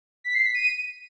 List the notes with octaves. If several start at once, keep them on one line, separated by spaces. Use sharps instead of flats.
B6
C7
B6
D#7